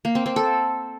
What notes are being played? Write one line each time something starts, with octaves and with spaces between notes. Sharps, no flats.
A#3
C4
C4
A4